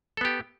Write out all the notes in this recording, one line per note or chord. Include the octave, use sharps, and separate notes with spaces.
B3 G4 A4